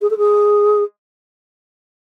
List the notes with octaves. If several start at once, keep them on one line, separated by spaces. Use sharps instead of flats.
G#4
A4
G#4